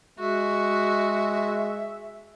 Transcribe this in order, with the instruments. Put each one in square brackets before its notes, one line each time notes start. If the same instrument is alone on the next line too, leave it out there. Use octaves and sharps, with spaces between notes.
[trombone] G#3 [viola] F#4 [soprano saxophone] E5